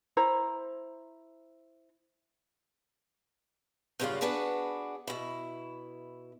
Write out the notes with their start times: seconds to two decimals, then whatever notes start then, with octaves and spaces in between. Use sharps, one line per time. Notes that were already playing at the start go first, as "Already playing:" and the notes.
0.17 E4 C5 A#5
4.00 G2 A#2 C#3 F#3 D4 F4
4.21 B3 D4 F#4 G#4 B4
5.07 B2 E4